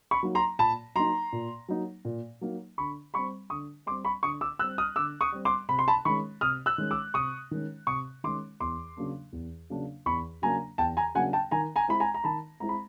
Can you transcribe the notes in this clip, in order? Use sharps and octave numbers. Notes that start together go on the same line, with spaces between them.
B5 C#6
F#3 A#3 D#4
A#5 C6
A#2 A5 B5
F#3 A#3 D#4 A#5 C6
A#2
F#3 A#3 D#4
A#2
F#3 A#3 D#4
D3 B5 C#6
G3 C4 B5 C#6
D3 C#6 D#6
G3 C4 C6 D6
B5 C#6
D3 C#6 D#6
D6 E6
G3 C4 E6 F#6
D#6 F6
D3 D6 E6
C#6 D#6
G3 C4
C6 D6
C3 B5
C6
A5 B5
D#3 G#3 C#4 B5 C#6
C3 D#6 F6
E6 F#6
D#3 G#3 C#4
D6 E6
C3 C#6 D#6
D#3 G#3 C#4
C3 C#6 D#6
D#3 G#3 C#4 C6 D6
E2 C6 D6
C#3 F#3 A#3 D4
E2
C#3 F#3 A#3 D4
E2 B5 C#6
C#3 F#3 A#3 D4 G#5 A#5
E2 G5 A5
G#5 A#5
C#3 F#3 A#3 D4 F#5 G#5
G5 A5
D#3 G#5 A#5
G#5 A#5
G#3 C4 E4 B5
G#5 A#5
A#5
D#3 A5 B5
G#3 C4 E4 A#5
B5